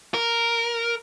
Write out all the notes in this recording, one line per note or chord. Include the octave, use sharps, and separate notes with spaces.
A#4